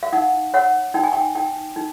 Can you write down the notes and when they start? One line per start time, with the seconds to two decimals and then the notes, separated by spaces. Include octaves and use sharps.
0.03 F5
0.13 D#4 F#5
0.54 C#5 F#5
0.94 D#4 G5
1.04 G#5
1.13 G5
1.35 D#4 G5
1.76 D#4